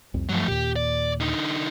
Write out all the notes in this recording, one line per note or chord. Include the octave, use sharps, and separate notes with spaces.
C2 F2
G2 F3 F#3 A3
D#2 A#2 G4
D5
D3 D#4